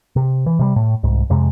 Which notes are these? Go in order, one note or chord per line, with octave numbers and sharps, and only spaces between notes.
C3
E3
C3 E3 G3
A2
C2 G#2
F2 C3 G#3